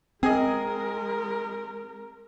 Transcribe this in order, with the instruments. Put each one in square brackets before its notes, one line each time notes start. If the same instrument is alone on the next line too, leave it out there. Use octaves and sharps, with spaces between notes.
[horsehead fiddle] G#3 A#4 [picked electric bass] C4 [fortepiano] G#4 D#5